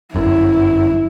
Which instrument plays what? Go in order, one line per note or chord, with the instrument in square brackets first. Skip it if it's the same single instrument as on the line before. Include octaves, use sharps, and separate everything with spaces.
[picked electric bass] G1 F#2 [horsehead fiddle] E4